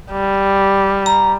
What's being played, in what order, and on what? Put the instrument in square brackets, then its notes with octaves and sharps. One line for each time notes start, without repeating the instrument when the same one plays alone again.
[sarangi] G3
[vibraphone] A#5